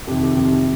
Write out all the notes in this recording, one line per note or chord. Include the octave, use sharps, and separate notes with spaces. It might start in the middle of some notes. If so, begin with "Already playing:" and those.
F2 C3 D#3 G4
G4
F2 C3 D#3 G4